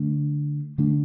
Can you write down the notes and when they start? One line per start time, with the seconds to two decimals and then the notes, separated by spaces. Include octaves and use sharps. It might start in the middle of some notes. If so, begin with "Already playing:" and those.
Already playing: D3 A3 D4
0.78 D3 A3 D4